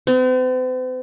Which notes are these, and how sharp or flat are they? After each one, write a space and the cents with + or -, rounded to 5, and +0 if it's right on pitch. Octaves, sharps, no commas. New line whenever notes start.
C4 -45